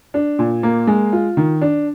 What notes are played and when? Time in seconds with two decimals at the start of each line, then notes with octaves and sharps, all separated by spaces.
0.14 D4
0.39 A#2
0.63 A#3
0.87 G#3
1.13 F4
1.37 D#3
1.61 D4